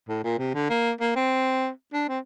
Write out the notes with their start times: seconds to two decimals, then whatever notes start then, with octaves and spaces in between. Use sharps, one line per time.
0.09 A2
0.24 A#2
0.39 C3
0.55 D3
0.70 A#3
1.01 A#3
1.15 C4
1.93 D4
2.08 C4